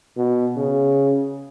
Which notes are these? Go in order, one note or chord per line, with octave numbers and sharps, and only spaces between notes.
B2
C#3